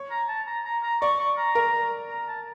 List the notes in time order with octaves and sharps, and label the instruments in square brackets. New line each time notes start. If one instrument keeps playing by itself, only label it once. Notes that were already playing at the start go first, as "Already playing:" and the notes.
Already playing: [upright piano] C#5
[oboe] A#5
A5
A#5
A#5
A#5
[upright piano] D5 [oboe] C#6
[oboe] C#6
A#5
[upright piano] A#4
[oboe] A#5
A5